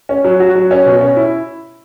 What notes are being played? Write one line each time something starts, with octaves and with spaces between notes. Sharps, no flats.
C#4
F#3
F#4
F#3
C#4
B2
C#4
E4